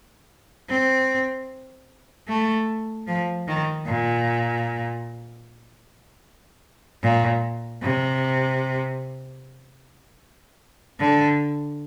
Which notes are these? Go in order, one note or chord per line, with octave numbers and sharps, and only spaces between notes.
C4
A3
F3
D#3
A#2
A#2
C3
D3